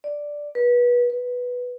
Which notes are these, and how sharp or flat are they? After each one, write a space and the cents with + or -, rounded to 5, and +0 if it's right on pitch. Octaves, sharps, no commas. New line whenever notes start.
D5 +0
B4 -25
B4 -5